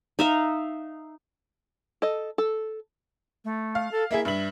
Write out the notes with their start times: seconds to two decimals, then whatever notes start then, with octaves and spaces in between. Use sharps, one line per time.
0.19 D#4 E5 F5
2.02 A4 D#5
2.38 A4
3.44 A3
3.75 F5
3.91 A4
4.11 A#3 E4 G#4 E5
4.25 G2 E5 F#7